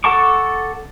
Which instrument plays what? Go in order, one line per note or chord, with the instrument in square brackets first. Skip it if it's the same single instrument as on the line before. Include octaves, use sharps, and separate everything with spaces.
[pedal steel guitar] A4 F#5 A5 C#6 D6